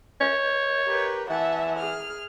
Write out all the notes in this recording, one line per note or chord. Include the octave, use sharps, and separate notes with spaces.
C#5
G4 A#4 B4
E3 E5 F#5 A5
G#4 F6